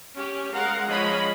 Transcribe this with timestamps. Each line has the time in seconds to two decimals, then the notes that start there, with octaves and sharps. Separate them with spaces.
0.15 C#4 G4
0.52 G#3 A#4 F5 F#5
0.86 F3 G#3 C#4 D#5 B5